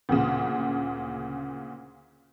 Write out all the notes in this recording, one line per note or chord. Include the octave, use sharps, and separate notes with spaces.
D2 A#2 C#3